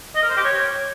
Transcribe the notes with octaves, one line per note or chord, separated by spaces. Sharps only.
D#5
A#4
C5
G4
C#5